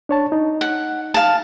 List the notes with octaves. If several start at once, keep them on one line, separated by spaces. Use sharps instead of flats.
D4 C#5 A5
D#4
F#5
F5 A5